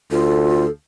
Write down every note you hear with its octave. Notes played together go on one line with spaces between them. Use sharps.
D2 F4 A4